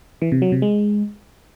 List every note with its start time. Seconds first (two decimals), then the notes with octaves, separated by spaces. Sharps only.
0.22 E3
0.32 C3
0.42 F#3
0.52 C3
0.62 G#3